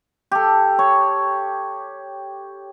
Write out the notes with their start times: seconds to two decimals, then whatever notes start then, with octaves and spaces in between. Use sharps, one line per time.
0.31 G4 A4
0.79 C#5